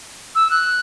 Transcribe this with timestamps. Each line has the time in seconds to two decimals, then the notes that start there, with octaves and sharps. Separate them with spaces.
0.35 E6
0.50 F#6